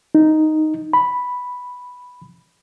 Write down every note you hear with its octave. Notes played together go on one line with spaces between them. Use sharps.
D#4
B5